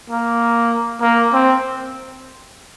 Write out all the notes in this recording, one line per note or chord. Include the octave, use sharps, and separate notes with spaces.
A#3
A#3
C4